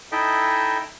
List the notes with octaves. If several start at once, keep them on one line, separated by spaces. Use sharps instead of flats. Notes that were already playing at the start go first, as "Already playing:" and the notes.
D#4 E4 A4 D#5 E5 G5